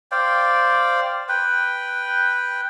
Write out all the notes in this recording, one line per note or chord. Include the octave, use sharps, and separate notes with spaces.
C5 D5 F5 G5
B4 G5